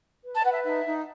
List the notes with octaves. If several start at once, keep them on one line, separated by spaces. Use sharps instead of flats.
B4
A5
E5
B4 F#5
E5
D#4 E5
D#4